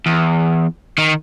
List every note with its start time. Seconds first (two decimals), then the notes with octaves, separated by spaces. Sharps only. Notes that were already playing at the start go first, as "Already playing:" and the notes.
0.06 E2
0.98 D#3